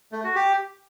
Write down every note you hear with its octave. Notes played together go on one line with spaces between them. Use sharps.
A3
F#4
G4